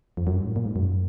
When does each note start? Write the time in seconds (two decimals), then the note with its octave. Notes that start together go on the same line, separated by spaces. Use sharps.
0.17 F2
0.27 F#2
0.37 G2
0.46 A2
0.56 A#2
0.65 G#2
0.76 F#2